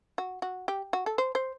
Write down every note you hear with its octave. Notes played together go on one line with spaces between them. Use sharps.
F#4
F#4
G4
F#4
A4
C5
C5